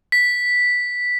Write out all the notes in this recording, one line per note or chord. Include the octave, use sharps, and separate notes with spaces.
B6